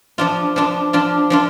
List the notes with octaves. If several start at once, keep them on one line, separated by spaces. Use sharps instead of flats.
F3 D4 F4
F3 D4 F4
F3 D4 F4
F3 D4 F4